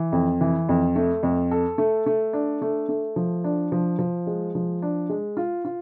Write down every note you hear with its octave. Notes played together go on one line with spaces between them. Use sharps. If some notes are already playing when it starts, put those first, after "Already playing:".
Already playing: E3
F2
E3
F2
A3
F2
A4
A3
A3
D4
A3
A3
F3
D4
F3
F3
G#3
F3
D4
G#3
F4
F4